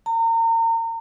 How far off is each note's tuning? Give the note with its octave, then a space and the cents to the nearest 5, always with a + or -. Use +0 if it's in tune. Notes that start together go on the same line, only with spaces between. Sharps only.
A#5 -35